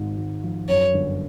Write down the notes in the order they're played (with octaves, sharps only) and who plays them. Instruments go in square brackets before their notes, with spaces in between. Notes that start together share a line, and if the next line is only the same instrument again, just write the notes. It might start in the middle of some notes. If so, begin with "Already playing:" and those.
Already playing: [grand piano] G#1 G#2
G#1
F3
[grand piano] F#2 [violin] C#5
[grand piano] G1